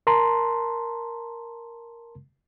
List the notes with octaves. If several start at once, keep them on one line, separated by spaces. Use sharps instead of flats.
A#4 A5 A#5 C6